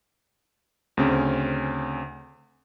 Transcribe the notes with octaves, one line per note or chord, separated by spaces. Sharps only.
D2 C#3 C4 C#4